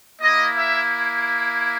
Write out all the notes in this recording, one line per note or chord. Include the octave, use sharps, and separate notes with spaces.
A#3 E4 D#5
E5